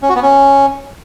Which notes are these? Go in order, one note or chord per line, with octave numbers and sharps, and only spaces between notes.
C#4
F#4
B3
C#4